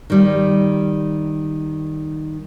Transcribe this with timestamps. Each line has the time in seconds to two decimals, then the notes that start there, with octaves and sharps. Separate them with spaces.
0.10 D#3 G3